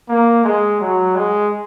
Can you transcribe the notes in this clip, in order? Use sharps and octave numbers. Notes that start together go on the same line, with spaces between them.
A#3
G#3
F#3
G#3